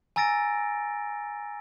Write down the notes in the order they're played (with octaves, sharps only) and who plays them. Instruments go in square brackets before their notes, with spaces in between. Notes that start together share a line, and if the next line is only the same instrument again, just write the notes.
[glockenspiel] G#5 A#5 E6 A6 A#6 D7